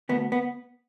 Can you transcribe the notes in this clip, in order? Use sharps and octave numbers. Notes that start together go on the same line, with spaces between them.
D2 B3
B3